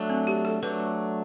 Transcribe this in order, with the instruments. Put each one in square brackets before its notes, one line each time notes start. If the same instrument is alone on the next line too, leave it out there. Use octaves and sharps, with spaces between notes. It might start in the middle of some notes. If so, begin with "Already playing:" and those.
Already playing: [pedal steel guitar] F#3 A3 D4
[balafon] C4
G4
A4
[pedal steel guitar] F#3 A3 D4 [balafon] B4